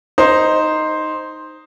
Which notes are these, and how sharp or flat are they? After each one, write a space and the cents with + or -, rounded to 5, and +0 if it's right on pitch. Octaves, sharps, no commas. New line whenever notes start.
D#4 +0 C5 +0